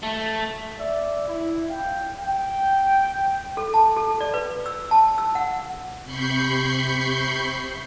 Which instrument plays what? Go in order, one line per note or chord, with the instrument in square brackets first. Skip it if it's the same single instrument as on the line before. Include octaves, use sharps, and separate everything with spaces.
[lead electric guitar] A3
[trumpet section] D5 E5
E4
F5 G5
G5
[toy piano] A4
A5
A4
D5
B4
E6
A5
E6
F#5
[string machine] C3 B5 C#6 G6 C7